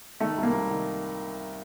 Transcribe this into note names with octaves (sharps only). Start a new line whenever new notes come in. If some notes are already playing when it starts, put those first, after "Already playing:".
D#3 A3
C2
A#3
C2
D#3